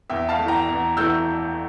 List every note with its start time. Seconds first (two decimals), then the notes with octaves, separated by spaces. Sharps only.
0.10 E2 E5 G5
0.29 F5 A5
0.39 E3 A3
0.48 G5 A#5
0.69 E2
0.97 E3 A3 E6 G6